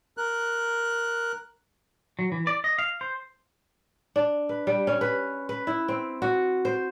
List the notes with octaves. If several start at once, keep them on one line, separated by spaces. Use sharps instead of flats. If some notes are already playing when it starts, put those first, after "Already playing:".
A#4 F#6
F#3
E3
D5
D#5
F5
C5
D4
B4
G3
C#4
B4
B4
E4
C4
F#4
C5